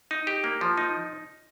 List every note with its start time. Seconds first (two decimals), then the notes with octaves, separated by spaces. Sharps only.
0.11 D#4
0.27 G4
0.44 A#3
0.61 F3
0.77 D#4